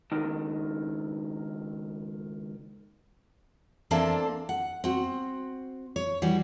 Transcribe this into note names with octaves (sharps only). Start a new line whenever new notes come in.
C#2 D#3
E3 A#3 C4 D4 A4 A5
F#5
C4 F#4
C#5
E3 G3 F#4